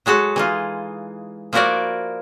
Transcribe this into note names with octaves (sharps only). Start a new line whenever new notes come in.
F#3 G#3 F#4 A4
E3 D#4 F4
F3 A#3 E4 F#4 A#4 D5